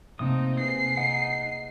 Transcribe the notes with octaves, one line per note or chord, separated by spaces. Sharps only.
C3 A3 A#3 C4 D#4 D#6
G#4 B4 C7
D#4 D#5 F#5